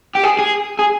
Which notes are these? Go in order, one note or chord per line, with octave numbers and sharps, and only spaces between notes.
G4
G#4
G#4
G#4